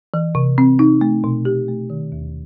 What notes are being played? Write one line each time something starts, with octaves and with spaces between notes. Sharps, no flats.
E3
C3
C4
D#4
A3
B2
G4
A3
D#3
D#2